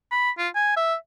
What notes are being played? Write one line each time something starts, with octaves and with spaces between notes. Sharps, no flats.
B5
F4
G#5
E5